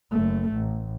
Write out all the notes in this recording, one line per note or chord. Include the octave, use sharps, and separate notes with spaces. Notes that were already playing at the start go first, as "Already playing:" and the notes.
F#1 A3
A1